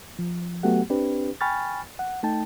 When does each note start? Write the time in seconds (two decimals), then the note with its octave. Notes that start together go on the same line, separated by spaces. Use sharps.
0.19 F3
0.63 F#3 A3 B3 F#4 G4 F#5
0.90 C4 D4 G4 B4
1.41 G5 G#5 B5 C#6 F6 A6
1.99 F#5
2.23 A3 D#4 G5 A5